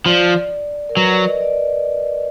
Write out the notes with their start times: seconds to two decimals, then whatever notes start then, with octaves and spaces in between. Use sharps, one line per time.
0.06 F3 D5
0.89 A#4
0.96 F#3 B4
1.11 D5
1.27 D#5
1.41 D5